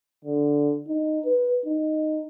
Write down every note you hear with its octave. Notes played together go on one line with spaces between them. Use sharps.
D3
D#4
B4
D#4